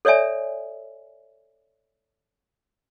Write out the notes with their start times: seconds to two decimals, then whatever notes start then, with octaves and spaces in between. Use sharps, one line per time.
0.05 A4 C#5 D5 E5 G#5